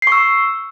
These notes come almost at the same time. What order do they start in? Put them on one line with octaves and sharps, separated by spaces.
C7 C#6 E6